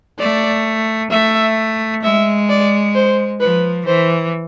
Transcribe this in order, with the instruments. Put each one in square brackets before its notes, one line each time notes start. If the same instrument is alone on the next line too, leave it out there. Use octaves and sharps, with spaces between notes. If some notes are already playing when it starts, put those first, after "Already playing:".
[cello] A3 [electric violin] D5
[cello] A3 [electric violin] E5
[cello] G#3 [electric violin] E5
[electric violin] D5
C5
[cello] F3 [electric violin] B4
[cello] E3 [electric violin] C5